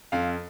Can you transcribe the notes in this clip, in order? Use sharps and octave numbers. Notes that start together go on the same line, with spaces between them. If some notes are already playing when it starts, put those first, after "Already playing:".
F2 F5